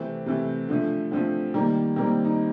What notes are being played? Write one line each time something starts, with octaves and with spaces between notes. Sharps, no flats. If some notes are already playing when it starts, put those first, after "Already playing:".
Already playing: C3 E3 A3 C4
C3 E3 A3
D3 F3 A3
D3 F3 A3 C4
D#3 G3 A#3
D#3 G3 A#3 C4
D#4